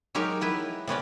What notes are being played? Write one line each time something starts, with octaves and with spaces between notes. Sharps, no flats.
F#3 G#3 D#4 G4 A#4
B3 E4 B4
C3 B3 C#4 D5